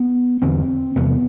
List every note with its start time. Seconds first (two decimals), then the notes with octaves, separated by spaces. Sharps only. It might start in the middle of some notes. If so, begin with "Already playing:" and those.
Already playing: B3
0.42 E2 D3 C4
0.96 E2 C3 B3